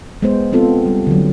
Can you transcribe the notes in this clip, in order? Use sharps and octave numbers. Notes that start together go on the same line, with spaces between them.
G#3 B3 C5
B3 C4 F4 A4
G3
D3 F#3